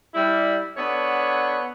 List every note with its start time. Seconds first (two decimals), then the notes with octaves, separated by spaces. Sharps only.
0.14 G3 E4
0.77 B3 D4 A4 C#5 F#5